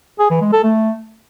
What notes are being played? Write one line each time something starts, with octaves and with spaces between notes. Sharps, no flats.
G#4
E3
G#3
A4
A3